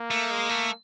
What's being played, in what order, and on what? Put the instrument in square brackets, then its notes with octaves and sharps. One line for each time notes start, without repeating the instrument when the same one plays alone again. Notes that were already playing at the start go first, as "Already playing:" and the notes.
Already playing: [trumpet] A#3
[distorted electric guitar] A3
G#3
A3